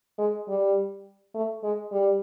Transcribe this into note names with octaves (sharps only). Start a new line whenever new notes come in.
G#3
G3
A3
G#3
G3